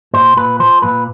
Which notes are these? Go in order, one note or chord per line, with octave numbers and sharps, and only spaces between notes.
A#2 C5
A#2 B4
F3 C5
A#2 B4